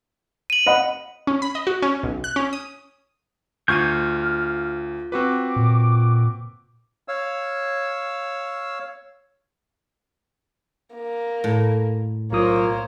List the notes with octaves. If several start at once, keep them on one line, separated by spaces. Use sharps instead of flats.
D#7 F#7
D#5 F#5 B5
C#4
B5
D#5
F#4
C#4
B1
F#6
C#4
D#6
D2 F4 C#6 F6 G6 G#6 D#7
C4 F#4 B4 D6
A#2
C#5 F5 E6
A#3
A2
B1 A#3 F4 C5 C#5 D#6